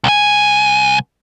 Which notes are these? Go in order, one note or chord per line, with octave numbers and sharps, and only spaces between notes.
C2 G#5